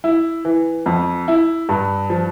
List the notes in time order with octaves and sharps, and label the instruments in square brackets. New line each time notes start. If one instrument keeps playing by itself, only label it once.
[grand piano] E4
E3
F2
E4
G2
F3